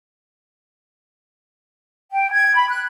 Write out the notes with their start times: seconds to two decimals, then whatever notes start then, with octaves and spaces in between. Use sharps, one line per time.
2.11 G5
2.31 G#6
2.55 B5
2.69 F#6